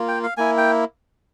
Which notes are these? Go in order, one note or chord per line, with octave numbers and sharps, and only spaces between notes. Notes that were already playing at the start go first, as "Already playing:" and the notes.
Already playing: A#3 F4
G5
F5
A#3 E4 G#5
G5